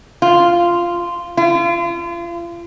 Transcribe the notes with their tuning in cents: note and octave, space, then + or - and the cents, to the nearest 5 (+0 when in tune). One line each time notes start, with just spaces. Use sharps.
F4 -10
F4 -35